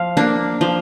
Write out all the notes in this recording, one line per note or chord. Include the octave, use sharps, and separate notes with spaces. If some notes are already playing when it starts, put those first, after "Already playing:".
Already playing: F3 F5
A#3 D4
F3